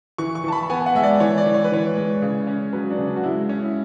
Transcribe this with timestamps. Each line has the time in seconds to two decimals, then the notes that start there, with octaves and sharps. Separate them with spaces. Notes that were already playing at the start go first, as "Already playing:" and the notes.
0.18 E3 C#6
0.35 C#6
0.44 E3 A5
0.52 B5
0.70 B3 G#5
0.86 F#5
0.95 G#3 E5
1.03 D5
1.20 E3 C#5
1.38 D5
1.46 E3
1.54 C#5
1.64 B4
1.72 E3 C#5
1.97 G#3
2.22 C#3
2.47 C#4
2.73 F#3 B4
2.90 D4
2.98 C#3
3.07 D4
3.16 F#4
3.23 G#3 E4
3.49 C#4
3.63 E4